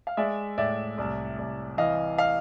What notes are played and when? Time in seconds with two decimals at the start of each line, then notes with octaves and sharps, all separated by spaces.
0.07 F5
0.17 G#3 D5 E5
0.58 A2 D5 E5
0.98 C2
1.38 C2
1.78 E3 D#5 F5
2.18 D#5 F5